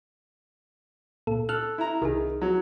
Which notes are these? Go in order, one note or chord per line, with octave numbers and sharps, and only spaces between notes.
C#2 A#2 A4
A4 F6 F#6
E4 A#5
C2 D#3 G#4
F#3